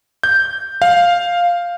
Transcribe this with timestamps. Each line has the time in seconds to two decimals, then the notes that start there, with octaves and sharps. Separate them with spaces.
0.23 G6
0.82 F5